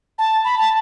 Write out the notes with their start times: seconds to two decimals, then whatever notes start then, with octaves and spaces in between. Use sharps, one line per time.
0.18 A5
0.44 B5
0.58 A5